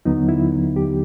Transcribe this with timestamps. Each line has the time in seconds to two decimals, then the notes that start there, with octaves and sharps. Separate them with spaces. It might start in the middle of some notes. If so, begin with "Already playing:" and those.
0.05 D#2 D3 F#3 B3 D#4
0.29 E4
0.76 G4